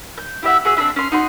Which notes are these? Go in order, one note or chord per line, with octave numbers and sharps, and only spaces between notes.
G6
E4 G4 E5 F#5
F#4 G#4 E5
C4 D4 E4 E5
C#4 C6
D#4 F#4 C6